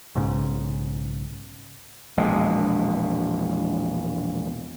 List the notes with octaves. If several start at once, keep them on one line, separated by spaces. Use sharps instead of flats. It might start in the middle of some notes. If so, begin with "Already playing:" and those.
B1 G#2 C#3
E1 A#1 B2 G#3